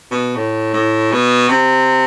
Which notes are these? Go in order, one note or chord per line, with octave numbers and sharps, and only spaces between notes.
B2
A2
A2
B2
C3